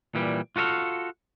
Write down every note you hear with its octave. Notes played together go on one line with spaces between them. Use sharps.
A#2 E3 G3
F4 F#4 A4 D#5 F5